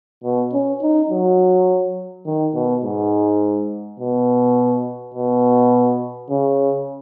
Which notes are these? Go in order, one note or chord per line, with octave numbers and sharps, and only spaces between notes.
B2
C#4
D#4
F#3
D#3
B2
G#2
B2
B2
C#3